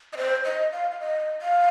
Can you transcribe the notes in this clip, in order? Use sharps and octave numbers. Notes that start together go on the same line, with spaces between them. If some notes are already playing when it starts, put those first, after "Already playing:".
D#5
C5
D#5
F5
F5
D#5
F5